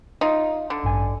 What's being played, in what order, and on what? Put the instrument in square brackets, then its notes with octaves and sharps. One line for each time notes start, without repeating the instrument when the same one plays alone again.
[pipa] D#4 F4
D3
[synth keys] A1 G2 G#5